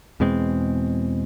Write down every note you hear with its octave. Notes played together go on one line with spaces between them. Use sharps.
E2 B2 G#3 C4